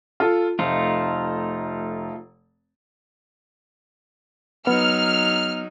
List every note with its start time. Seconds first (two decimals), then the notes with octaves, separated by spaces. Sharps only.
0.20 F4 A4
0.59 F1 A3 D#4 F4
4.67 F#3 B3 D#4 F6